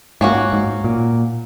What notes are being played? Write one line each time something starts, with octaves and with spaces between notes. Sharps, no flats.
G#2 A#3 C#4 F#4
G#2
A#2